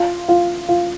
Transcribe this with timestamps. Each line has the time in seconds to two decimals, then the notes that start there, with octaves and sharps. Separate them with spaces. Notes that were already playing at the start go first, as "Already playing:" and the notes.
Already playing: F4
0.28 F4
0.69 F4